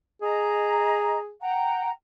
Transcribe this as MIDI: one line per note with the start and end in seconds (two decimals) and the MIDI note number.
0.22 1.32 68
0.22 1.16 75
0.22 1.16 82
1.41 1.89 78
1.41 1.89 79
1.41 1.89 82